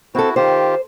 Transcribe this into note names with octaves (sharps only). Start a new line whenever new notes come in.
C4 E4 F#4 A4
D#3 F4 G4 C5